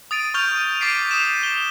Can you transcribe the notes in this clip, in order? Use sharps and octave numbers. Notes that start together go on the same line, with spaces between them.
D#6 A6 D7 D#7
C#6 F6 G6 F7
C#6
D6 A6 B6 C7 D7 D#7
D#6 E7
G7